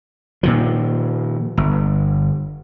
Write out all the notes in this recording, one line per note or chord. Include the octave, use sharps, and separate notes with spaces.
A#2 D#3 F3
G1